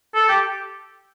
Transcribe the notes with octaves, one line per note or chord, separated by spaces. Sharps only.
A4
G4